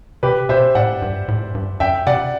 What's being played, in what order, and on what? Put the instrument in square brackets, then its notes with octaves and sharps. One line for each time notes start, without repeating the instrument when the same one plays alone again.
[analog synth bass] C3 [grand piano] G4 B4
[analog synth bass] B2 [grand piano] C5 E5
[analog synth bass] A2 [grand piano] D5 F#5
[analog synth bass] G2
A2
F#2
G2
[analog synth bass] F#2 [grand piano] E5 G5
[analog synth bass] C3 [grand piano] D5 F#5